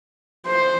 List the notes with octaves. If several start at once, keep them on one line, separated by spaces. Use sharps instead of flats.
C5